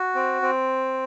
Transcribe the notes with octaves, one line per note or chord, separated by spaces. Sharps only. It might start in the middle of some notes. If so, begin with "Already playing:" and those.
Already playing: F#4
C4
C4